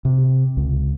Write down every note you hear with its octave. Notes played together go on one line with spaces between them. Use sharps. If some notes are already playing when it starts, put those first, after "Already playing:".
C3
C#2